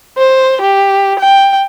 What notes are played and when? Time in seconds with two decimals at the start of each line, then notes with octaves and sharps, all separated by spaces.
0.18 C5
0.61 G4
1.19 G5